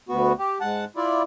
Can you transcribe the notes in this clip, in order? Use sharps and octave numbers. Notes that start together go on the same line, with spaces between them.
D2 B3 F#4
G4
G#2 F#5 A5
E4 F4 D5